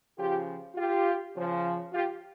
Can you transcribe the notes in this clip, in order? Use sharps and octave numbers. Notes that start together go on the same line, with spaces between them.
C#3 F3 F4 G4
F4 G4
C#3 F3
F4 G4